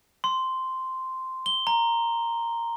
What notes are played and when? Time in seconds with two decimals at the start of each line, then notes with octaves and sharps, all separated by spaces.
0.24 C6
1.46 G7
1.67 A#5